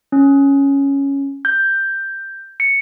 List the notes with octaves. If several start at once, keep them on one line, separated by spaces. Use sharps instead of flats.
C#4
G6
C#7